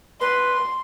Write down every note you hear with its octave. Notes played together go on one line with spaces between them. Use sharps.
B4 C6